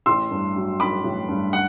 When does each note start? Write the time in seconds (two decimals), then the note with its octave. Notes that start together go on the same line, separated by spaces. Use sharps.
0.06 A1 C6 E6
0.31 G2
0.56 F#3
0.80 F#3 B5 D6
1.04 A1
1.29 G2
1.53 F#5